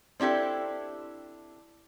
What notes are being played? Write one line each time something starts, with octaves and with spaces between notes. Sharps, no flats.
C4 D4 E4 G4 A4